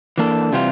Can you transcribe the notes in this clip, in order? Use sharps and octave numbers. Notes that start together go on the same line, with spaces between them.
E3 A#3 D4 A4
C3 E3 G3 C4 F4